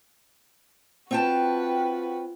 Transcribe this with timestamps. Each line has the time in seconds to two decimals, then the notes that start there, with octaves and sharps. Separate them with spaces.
1.11 C4 F4 F#4 B4 G5 A5